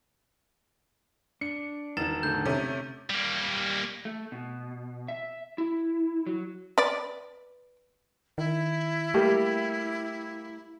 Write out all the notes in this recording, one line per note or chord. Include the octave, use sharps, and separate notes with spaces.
D4 C#7
E1 D#3 A6 E7
A2 D3 A4 G6
C3 A3 C#4
G3 A#3
A3
B2
E5
E4
F#3
B4 D5
D#3 E4
G3 A3 A#3 G4